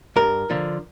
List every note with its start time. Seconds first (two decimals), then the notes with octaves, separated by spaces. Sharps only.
0.16 G2 A#4
0.50 D3 F3